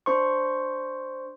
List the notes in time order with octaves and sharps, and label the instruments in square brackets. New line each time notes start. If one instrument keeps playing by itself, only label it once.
[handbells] D4 C5 C6 C#6